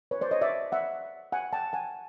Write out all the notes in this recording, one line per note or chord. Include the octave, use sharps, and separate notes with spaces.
B4 C#5
C5 D5
C#5 D#5
D5 E5
E5 F#5
F#5 G#5
G5 A5
F#5 G#5